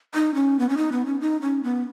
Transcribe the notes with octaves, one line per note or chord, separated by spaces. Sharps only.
D#4
C#4
B3
C#4
D#4
B3
C#4
D#4
C#4
B3